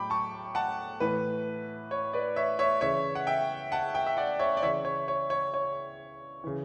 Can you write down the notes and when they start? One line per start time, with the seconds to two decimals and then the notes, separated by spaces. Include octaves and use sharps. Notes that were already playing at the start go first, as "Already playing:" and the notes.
Already playing: A2 F#3 G5 B5 D6
0.10 A5 C#6
0.55 F#5 A5
1.00 A2 E3 B4
1.91 C#5
2.13 B4 D5
2.36 C#5 E5
2.59 C#5 E5
2.81 C#3 E3 C#5 E5
3.15 F#5
3.27 E5 G5
3.72 F#5 A5
3.94 E5 G5
4.06 E5
4.17 D5 F#5
4.39 C#5 E5
4.57 D5
4.62 C#3 E3 C#5 E5
4.85 C#5
5.08 C#5
5.30 C#5
5.54 C#5
6.44 C#3 E3